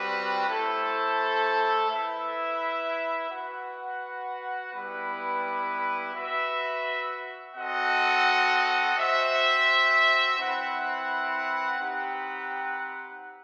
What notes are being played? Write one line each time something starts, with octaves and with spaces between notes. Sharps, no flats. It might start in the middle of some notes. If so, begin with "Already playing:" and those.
Already playing: G3 C4 F#4 B4
A3 E4 A4 C5
E4 B4 E5
F#4 B4 F#5
G3 B3 E4 B4
F#4 B4 E5
C4 F#4 A4 D#5 F#5
F#4 C5 E5 G5
C4 E4 B4 F#5
C4 D#4 G4 B4 F#5